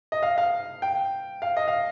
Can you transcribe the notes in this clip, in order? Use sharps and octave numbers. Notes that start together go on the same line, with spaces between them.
D#5
F5
F5
G5
F5
D#5
F5